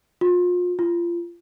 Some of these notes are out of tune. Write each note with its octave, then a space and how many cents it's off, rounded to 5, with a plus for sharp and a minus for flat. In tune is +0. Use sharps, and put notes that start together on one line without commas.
F4 +35
F4 -25